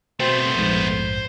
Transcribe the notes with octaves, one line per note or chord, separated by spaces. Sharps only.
B2 A3 B3 C4 C5
A#1 F2 G#2